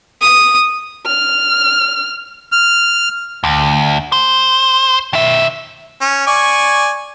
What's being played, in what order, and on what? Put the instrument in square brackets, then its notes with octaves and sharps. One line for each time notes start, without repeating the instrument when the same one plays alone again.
[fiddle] D#6
[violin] F6
[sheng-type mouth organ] F6
[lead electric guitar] D2
C5
D#3 E5
[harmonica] C#4
D5 G#5 C#6